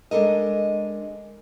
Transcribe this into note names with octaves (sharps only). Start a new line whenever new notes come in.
G#3 D4 A4 A#4 D#5